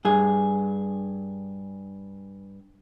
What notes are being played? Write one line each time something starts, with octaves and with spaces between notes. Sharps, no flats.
G2 G#4